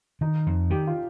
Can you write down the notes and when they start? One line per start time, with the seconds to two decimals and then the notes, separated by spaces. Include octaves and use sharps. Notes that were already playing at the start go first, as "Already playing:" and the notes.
0.21 D#3 D#4
0.47 F2
0.70 D#3 G4
0.87 F4